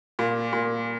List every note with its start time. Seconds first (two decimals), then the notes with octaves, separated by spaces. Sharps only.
0.19 A#2
0.53 A#2